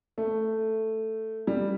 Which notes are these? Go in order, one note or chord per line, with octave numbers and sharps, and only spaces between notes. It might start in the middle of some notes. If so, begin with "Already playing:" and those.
A3
G3